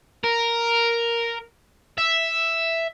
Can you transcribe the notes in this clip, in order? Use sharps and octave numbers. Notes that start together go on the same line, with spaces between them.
A#4
E5